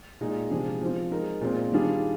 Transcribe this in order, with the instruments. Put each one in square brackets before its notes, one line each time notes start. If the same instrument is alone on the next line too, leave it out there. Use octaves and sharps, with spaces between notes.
[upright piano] A#2 G#3 D#4 G#4
C3 F3 G#3 D4 G#4
F3 C4 F4
G#3 D#4 A#4
A#2 G#3 C4
D#3 G3 D4 F4 G#4